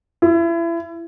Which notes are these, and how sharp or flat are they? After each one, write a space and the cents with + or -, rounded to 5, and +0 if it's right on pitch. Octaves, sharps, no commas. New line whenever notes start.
E4 +30